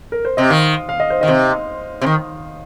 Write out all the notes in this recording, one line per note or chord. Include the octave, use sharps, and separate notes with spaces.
A#4
C5
C3 D#5
D#3 F5
F5
D#5
C5
D#3 D#5
C3
C3
D#3